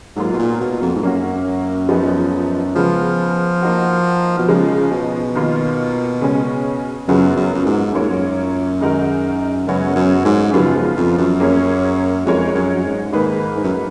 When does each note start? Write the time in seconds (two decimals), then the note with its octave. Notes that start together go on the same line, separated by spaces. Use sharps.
0.16 G#2 F#3 A#3 F4
0.33 B2
0.39 A#2
0.60 B2
0.82 F2
0.95 G#2
1.02 F#2 A#3 C#4 F#4
1.89 F3 B3 D#4 G#4
2.75 C#3 F3 G#3 B3
3.62 A#3 D#4 F#4
4.38 B2
4.48 C#3 F3 G#3 D#4
4.91 B2
5.35 D#3 A#3 F4
6.21 C#3 G#3 C#4
7.08 F#2 C#3 F#3 B3 F4 G#4
7.36 F#2
7.54 F#2
7.66 G#2
7.94 F#2 A#3 F4 A#4 C#5
8.01 G#2
8.09 F#2
8.80 D#3 G#3 D#4 F#4 A#4
9.67 F#2 C#3 G#3 B3 F#4 C#5
9.96 F#2
10.25 G#2
10.53 F#2 C#3 F3 B3 F4
10.96 F2
11.18 F#2
11.40 A#3 C#4 G#4 C#5
12.26 F2 G#3 D#4 A#4 C#5
12.55 F#2
12.76 F#2
12.85 G#2
13.12 G#2 D#3 A#3 D#4 G#4 B4
13.57 G#2
13.64 F#2